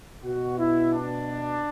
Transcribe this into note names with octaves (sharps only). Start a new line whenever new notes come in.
B2 F#4
E4
D4